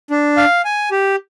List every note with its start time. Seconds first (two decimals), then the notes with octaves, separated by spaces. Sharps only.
0.11 D4
0.37 F5
0.65 G#5
0.91 G4